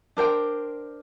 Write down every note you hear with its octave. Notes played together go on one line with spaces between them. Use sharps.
D4 A#4 C5 G5